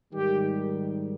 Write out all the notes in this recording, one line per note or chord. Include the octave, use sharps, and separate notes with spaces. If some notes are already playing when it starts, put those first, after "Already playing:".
G#2 D#3 G3 G4